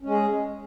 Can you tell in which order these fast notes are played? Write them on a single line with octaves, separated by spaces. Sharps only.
C#4 G#3 G#4